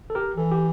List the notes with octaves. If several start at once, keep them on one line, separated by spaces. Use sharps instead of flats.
A4
G4 A#4
E3 A4
G4